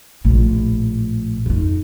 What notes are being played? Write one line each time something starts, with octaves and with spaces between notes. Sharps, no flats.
A#1 A2
F2 D#4